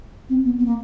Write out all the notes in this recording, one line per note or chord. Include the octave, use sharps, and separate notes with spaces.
C4
B3
B3
A#3